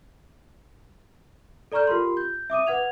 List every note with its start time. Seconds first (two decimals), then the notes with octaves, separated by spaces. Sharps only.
1.72 A4 D5 A#5 C#6 F6 G6
1.87 F4 G4 A#4 B5 C6
2.17 G6
2.50 E5 D6 D#6 D#7
2.67 B4 F#5 G#6 F7